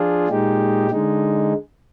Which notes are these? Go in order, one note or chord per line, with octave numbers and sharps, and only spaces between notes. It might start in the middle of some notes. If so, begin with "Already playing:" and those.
Already playing: F3 D4 F4 G#4
A#2 G#3 D#4 G4
D3 G#3 D#4